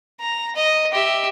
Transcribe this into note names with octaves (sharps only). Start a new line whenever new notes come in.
A#5
D#5
G4 E5